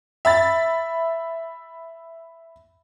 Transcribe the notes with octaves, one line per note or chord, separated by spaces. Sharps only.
E5 B5 A6